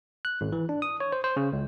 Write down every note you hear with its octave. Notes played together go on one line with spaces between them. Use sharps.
F#6
G#1
E3
D4
D#6
C#5
C5
C5
C#3
C#2